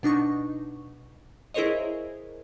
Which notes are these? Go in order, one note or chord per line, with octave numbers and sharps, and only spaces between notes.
B2 D4 D#4 C#6
E4 G#4 A#4 C5 C#5 D#5